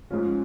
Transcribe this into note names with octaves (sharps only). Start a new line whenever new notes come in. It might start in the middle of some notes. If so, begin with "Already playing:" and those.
G#2 F3 G#3 C#4 F4